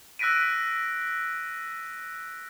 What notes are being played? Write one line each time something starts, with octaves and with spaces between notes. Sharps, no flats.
E6 F#6 A#6 B6 D7 D#7